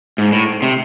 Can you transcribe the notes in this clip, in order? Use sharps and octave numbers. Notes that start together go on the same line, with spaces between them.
G#2
A2
C3